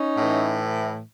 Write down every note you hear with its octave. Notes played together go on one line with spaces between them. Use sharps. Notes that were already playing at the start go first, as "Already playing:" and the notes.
Already playing: C#4 D#4
A2 E3